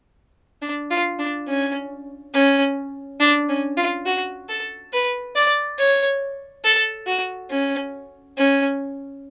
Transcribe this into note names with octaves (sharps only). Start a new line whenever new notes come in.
D4
F4
D4
C#4
C#4
D4
C#4
F4
F#4
A4
B4
D5
C#5
A4
F#4
C#4
C#4